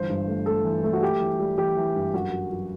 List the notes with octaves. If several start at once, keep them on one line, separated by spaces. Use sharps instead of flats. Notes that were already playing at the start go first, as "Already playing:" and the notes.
Already playing: G1 E3 C5
G2
A3
A3 A4
E3
A3
F#4
G3 G4
E3
G3
E3 G4
E3
G2
F#2 F#4
F#3
F#3